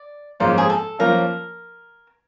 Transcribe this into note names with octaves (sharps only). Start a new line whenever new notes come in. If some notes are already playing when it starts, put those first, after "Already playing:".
Already playing: D5
G#2 F3 A#3 C#4 F4 C5
G#4
A4
F3 A#3 C#4 F4 A#4